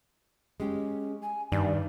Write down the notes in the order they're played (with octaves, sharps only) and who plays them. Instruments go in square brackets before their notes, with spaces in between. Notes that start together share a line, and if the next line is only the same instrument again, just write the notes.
[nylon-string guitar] G#3 G4 [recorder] C#4
[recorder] G#5
[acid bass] G2 [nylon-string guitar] D#3 [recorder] D5